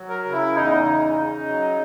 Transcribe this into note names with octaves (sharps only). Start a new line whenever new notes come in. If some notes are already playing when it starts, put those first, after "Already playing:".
Already playing: F#3
A#4
C#3
E4
E2 D#4
C#3
C#3
F#3